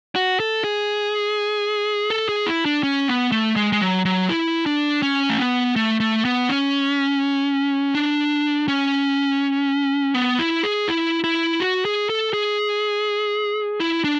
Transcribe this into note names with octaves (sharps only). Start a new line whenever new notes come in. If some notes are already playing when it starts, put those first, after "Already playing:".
F#4
A4
G#4
A4
G#4
E4
D4
C#4
B3
A3
G#3
G#3
F#3
F#3
E4
D4
C#4
A3
B3
A3
A3
B3
C#4
D4
C#4
B3
E4
G#4
E4
E4
F#4
G#4
A4
G#4
E4
D4